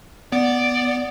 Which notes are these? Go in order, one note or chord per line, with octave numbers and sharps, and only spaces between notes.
B3 D5